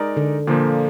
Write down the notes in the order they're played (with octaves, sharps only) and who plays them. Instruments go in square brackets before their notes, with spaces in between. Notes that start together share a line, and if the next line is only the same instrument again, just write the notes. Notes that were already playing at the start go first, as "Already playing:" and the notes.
Already playing: [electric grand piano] G#3 D#4 A#4 D5
[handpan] D3
[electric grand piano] A#2 F3 A#3 [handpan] D3